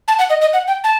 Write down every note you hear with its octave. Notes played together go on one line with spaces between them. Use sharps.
A5
F#5
D#5
D#5
F#5
G5
A5